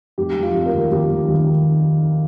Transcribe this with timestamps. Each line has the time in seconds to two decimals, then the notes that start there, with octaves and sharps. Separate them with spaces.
0.18 F1 G4
0.36 F1
0.43 F4
0.54 F1
0.66 A#4
0.73 D#2
0.91 D#2 G4
1.09 D#2
1.28 D#3